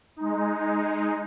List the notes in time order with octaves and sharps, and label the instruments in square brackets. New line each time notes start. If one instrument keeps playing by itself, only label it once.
[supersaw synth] G#3 D#4